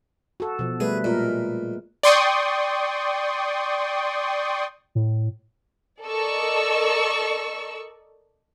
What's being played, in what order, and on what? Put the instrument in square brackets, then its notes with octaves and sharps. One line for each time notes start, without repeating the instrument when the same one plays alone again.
[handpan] F#4 A4
B2 F3
[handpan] G3 A3 B4 [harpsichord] G#4
[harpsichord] A#2 [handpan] G#3 A#4
[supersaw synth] D5 G5 C6 C#6 D#6
[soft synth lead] A2
[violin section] A4 A#4 D5 D#5 C#6 E6